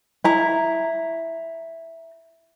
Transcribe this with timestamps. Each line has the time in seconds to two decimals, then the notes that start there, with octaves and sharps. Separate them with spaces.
0.24 E4 A#5